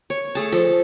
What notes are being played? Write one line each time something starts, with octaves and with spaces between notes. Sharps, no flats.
C#5
A3 G#4 A5
F3 A4